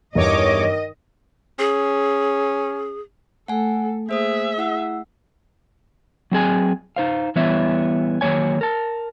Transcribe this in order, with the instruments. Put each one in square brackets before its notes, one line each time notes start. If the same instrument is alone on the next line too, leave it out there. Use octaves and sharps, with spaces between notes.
[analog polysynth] E2 C#5 D6 [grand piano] G2 [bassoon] D#3 [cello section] D#5
[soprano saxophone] C#4 [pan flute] G#4
[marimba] A3 [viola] A4 [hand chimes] F#5 G#5
[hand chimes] A#3 C5 D#6 [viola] G#4 E5
[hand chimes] E4 F#5 E6
[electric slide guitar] F#3 C4 G#4 G#5
D#4 C5 F5
E3 G3 B3 E4 C#5 E5
D#3 F#3 A#3 C#5 G#5
A#4 A5